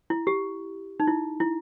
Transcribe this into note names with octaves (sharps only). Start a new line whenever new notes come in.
E4
G4
D#4
E4
E4